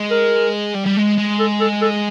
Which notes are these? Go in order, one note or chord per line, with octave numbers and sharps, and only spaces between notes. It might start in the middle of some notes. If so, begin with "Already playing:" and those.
Already playing: G#3
A#4
G3
G3
G#3
G#3
A4
A4
A4